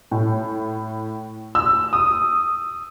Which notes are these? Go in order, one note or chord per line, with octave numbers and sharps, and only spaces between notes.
A2
E6
D#6